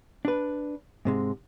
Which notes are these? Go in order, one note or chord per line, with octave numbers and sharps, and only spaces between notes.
D4 B4
G#2 C3 G#3